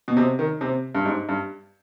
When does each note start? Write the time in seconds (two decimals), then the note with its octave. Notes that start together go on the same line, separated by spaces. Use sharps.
0.08 B2
0.17 C3
0.39 D#3
0.61 C3
0.95 G2
1.05 G#2
1.29 G2